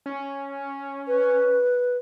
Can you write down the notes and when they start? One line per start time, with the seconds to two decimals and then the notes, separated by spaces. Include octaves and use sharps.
0.06 C#4
1.07 B4